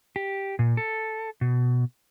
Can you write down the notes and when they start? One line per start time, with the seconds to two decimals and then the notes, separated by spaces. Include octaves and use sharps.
0.16 G4
0.59 A#2
0.77 A4
1.41 B2